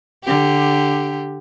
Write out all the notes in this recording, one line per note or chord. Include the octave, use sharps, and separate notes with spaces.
D3 G4